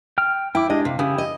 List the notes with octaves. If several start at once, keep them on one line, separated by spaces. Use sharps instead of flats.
G5 F6
E4 G5 D6
G#3 D4 G4 D#5
C3 F5
C#3 E4 G4 D#6
D#5